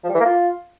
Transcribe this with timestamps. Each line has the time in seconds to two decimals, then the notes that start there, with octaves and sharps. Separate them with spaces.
0.04 F3
0.09 G3
0.15 E3
0.20 A#3
0.26 F4